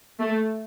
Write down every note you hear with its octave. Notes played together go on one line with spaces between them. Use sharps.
A3